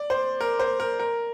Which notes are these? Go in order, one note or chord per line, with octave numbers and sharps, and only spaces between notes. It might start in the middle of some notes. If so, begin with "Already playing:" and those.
Already playing: D5
C5
A#4
C5
A#4
A#4